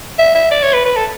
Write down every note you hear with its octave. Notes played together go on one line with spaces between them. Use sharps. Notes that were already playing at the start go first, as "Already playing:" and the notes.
E5
E5
D5
C#5
B4
B4
A4